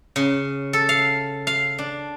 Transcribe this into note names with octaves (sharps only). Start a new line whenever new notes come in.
C#3
A4
F5
F5
D4